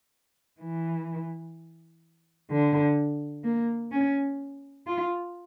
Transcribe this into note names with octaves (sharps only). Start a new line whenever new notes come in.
E3
D3
A#3
C#4
F4